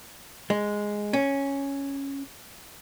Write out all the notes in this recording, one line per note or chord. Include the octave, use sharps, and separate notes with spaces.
G#3
C#4